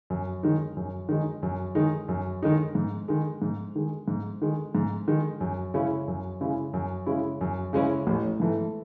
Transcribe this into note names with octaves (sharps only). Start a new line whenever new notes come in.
F#2
D#3 G#3 D#4
F#2
D#3 G#3 D#4
F#2
D#3 G#3 D#4
F#2
D#3 G#3 D#4
G#2
D#3 G#3
G#2
D#3 G#3
G#2
D#3 G#3
G#2
D#3 G#3
F#2
C#3 G#3 C#4 E4
F#2
C#3 G#3 C#4 E4
F#2
C#3 G#3 C#4 E4
F#2
C#3 G#3 C#4 E4
A1
G#2 E3 A3